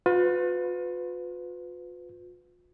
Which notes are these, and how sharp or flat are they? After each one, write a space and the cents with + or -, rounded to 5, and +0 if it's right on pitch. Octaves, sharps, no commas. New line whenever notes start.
F4 +45 B4 +25